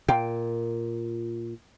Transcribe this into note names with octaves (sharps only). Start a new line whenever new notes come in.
A#2 F5 G5